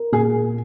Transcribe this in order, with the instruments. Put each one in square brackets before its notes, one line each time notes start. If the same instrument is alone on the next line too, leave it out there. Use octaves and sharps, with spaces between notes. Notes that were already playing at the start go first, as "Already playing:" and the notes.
Already playing: [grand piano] A#4
[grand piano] A#2 [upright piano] G#4